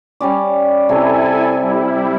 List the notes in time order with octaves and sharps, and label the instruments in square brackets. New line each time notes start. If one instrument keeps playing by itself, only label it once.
[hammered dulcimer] G3 C#4 D5
[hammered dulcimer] C3 [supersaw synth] E4 A4 G#5
[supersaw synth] G3 E4